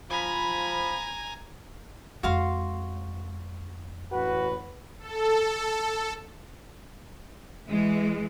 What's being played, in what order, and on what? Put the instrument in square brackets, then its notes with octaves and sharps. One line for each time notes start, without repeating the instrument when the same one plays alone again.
[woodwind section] F3 B5 [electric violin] G#5 A#5
[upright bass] F2 G#3 [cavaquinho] F#4 F5 C6
[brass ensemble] A1 B4 [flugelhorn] F#4
[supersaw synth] A4
[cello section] E3 G#3